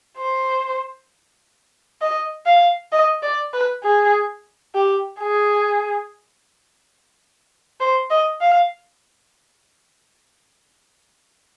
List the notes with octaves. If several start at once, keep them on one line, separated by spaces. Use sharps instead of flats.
C5
D#5
F5
D#5
D5
B4
G#4
G4
G#4
C5
D#5
F5